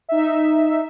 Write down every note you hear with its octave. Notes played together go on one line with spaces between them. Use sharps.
D#4 E5